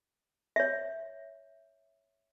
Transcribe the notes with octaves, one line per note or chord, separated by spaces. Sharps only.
C#5 E5